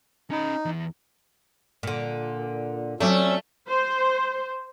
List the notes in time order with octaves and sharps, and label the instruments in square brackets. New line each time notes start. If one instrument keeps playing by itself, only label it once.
[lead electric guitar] C#4 B5 [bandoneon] D#4
[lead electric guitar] E2 E3
[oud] A#2 D3
[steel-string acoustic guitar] F#3 C4 [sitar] A3 [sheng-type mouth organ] C#4 E6 [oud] D5
[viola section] C5